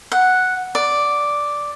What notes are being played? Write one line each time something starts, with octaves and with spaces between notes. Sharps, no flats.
F#5
D5